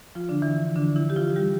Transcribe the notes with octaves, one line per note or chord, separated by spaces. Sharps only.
F3 F4
D3 D4
E3 E4
D3 D4
E3 E4
G4
F3 F4
F4
G3 G4